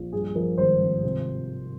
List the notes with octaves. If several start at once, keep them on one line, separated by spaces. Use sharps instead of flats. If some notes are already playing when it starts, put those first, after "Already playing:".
Already playing: A#1
G2 G#4
F3 A#4
G#1 C5
G#1
C3